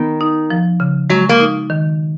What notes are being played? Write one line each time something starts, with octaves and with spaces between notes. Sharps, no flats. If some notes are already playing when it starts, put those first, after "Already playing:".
Already playing: D#3 B3
D#4
F3
C#3
F#3 G#3
A#3
D#4
D#3